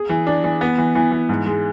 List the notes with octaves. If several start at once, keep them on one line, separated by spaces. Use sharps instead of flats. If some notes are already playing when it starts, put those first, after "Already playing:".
Already playing: G#4
E3
D4
E3
B3
E3
E3
E3
G#2
G#3